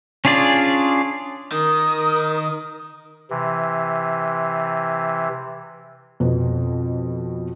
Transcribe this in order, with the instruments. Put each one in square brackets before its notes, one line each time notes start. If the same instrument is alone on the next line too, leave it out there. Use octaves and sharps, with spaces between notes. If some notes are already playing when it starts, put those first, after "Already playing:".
[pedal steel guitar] C#4 D4 F4 G#4 D5
[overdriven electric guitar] D#3 [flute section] A#4 D#6
[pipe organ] C3 E3
[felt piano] F2 B2 B3